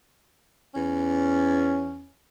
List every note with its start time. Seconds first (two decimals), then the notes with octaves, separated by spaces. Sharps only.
0.75 E2 C#4